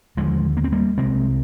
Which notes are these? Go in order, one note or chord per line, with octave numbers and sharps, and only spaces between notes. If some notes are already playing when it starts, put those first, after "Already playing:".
D#2 D3 F3 G#3
A#3
C4
G3 A#3
C2 C3 G#3 C4